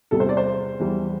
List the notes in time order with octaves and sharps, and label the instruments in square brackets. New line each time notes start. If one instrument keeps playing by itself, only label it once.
[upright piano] E2 C3 G3 A4
C5
D5
C5
E2 E3 G3